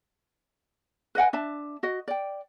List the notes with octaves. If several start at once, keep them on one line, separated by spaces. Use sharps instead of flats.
B4 D#5 F#5 G#5
D4 E5 A5
F#4 D#5
D5 G5